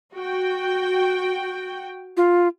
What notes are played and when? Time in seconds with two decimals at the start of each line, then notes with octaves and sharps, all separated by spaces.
0.14 F#4 G5
2.17 F4